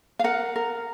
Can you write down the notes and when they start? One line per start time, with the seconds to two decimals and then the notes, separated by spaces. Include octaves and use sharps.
0.19 F5
0.24 A#4 F#5
0.56 A#4